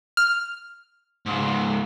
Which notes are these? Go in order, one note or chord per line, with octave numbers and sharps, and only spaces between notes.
F6
C#2 G#2